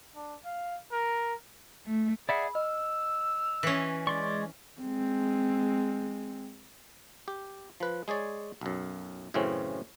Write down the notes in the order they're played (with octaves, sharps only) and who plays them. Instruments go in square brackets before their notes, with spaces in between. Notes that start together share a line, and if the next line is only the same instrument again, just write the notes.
[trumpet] D4
F5
A#4
[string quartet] A3
[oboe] G#4 [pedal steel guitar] D5 E5 F#5 [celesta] B5
[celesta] D#5 [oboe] E6 [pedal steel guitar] F6
[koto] E3 C#4
[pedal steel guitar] G#3 C6 C#6 [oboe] D5
[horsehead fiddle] G#3 C4
[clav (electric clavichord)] G4
F3 B4
G#3 G#4 C#5 D5
B1 F#2
F#2 A2 C#3 E3 C4 C#4